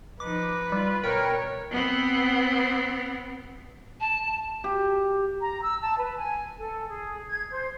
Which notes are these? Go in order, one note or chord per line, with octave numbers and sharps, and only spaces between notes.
F3 D#4 B4 D6
G3 F4
B2 A#4 C#5 G5
B3 C4
A5
G4
A#5
E6
A5
B4
G#5
A4
G#4
G#6
C5